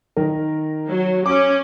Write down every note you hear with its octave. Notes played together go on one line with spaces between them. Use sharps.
D#3 A#4
F#3
C#4 D6